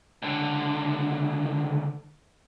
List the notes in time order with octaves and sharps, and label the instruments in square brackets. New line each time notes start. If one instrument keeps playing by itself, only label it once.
[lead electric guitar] C#2 D3